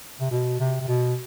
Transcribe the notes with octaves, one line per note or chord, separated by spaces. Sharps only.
C3
B2
C3
C3
B2